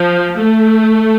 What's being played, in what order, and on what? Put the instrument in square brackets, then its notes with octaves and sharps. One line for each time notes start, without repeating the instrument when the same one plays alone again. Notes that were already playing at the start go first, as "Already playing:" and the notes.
Already playing: [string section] F3
A3